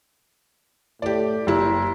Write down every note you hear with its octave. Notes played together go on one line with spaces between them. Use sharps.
A2 G4 D5
F#1 E4 G4